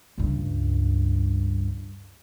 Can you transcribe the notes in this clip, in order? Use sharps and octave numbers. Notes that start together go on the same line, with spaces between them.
C#2 G2